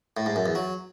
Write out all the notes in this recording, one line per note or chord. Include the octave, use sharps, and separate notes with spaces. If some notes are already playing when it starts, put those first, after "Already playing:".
A2
G#2
F#2
E2
F#3